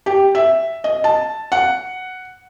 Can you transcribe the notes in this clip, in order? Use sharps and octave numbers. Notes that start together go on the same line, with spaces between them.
G4
E5
D#5
A5
F#5